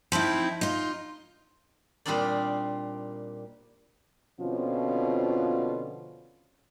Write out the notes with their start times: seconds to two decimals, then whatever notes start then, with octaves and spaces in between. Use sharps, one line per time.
0.12 F3 C4 D#4 E4
0.61 D#4 F4
2.06 A#2 G3 C4 D4 D#4 D5
4.40 B2 D3 F3 C4 C#4 F4